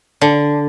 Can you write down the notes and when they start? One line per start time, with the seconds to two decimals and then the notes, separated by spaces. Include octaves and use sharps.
0.21 D3